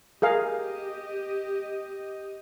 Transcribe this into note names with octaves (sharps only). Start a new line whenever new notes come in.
G4 G#4 A#4 D#5 F5